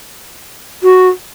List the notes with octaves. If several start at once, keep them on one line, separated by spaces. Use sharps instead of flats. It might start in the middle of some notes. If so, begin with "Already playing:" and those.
F#4